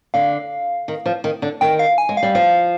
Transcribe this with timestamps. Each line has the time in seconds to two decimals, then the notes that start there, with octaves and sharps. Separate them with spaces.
0.14 D3 F5
0.88 D#3
1.06 F3
1.24 D#3
1.42 D3
1.61 D#3 G5
1.79 F5
1.98 G#5
2.09 G#3
2.17 F5
2.23 G3
2.35 F3 F5